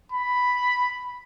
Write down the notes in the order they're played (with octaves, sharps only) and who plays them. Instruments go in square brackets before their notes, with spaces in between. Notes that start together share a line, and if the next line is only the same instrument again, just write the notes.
[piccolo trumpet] B5